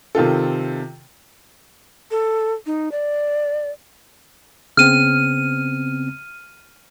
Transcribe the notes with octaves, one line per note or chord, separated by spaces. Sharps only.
C3 D#3 F4 A4
A4
D#4
D5
C#3 B3 C4 F6 D#7